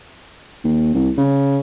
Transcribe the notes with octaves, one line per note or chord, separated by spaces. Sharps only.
D#2
C2
C#3